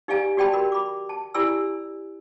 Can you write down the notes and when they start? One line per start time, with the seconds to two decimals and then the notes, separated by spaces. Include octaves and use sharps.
0.08 D#4 G4 D5 F5 G#5 A#5
0.37 F#4 G4 D5 G5 A5 B5
0.53 F#4 A#4 B5
0.72 B5 D6
1.09 A5
1.34 E4 G4 D5 G#5 B5 E6